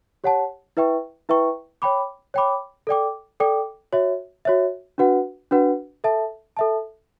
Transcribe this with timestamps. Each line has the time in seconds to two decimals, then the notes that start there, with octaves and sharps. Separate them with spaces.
0.24 G4 C#5 F#5 A5
0.77 E4 B4 E5 G5 C#6
1.29 E4 B4 E5 G5 C#6
1.82 C#5 G5 B5 D6
2.34 C#5 G5 B5 D6
2.87 A4 D5 G5 D6
3.40 A4 D5 G5 D6
3.93 F#4 C#5 E5
4.45 F#4 C#5 E5
4.98 D4 F#4 B4 F#5
5.51 D4 F#4 B4 F#5
6.04 A4 E5 A5
6.57 A4 E5 A5